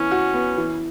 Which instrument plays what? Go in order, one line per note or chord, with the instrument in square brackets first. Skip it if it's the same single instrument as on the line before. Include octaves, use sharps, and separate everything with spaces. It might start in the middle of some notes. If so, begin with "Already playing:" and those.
Already playing: [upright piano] E3 B3 [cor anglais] C#4
[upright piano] F#4
B3
E3